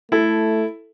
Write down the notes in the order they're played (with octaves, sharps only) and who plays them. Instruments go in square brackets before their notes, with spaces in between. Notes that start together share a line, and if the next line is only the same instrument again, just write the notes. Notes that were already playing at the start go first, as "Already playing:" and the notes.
[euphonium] A3 [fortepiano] E4 A4